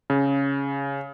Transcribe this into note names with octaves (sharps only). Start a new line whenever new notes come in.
C#3